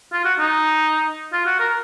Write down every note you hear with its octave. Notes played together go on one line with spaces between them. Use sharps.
F4
F#4
D#4
F4
F#4
A#4